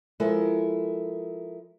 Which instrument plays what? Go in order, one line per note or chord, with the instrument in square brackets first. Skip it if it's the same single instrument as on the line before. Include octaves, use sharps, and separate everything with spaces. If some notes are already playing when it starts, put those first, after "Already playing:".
[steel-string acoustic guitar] F3 G#3 E4 F4 A4 A#4